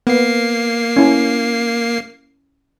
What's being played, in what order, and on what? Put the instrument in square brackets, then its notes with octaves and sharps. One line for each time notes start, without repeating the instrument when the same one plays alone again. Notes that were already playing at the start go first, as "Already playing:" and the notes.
[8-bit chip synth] A#3 C7 [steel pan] B3
[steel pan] C#4 E4